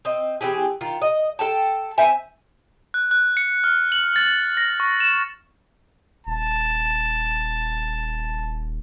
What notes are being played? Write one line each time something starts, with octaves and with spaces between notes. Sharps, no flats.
C4 D#5
E3 C4 G4 G#4
D#3 F4
D#5
A4 G5 A5
C4 C5 E5 G#5
F#6
F#6
C#7
F6
F#7
A6
A#6
C#6
E7
D#1 A5